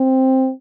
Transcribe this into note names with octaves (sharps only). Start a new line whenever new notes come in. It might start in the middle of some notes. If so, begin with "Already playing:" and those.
Already playing: C4